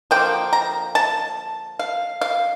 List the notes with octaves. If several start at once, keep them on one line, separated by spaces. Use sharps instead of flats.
D3 F3 A#3 G5
A#5
A5
F5
F5